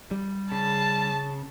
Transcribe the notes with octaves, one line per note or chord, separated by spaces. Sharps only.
G3
C#3 A5